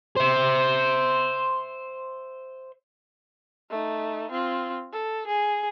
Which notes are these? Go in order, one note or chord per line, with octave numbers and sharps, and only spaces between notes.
C5 E5
A3 D#4
C4 F4
A4
G#4